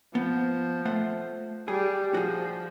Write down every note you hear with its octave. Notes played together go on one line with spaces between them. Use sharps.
F3 B3
A3 C5 F#5
G3 G#4
F3 F#4 G#4